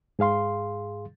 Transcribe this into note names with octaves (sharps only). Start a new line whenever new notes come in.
G#2 G#4 F5 C6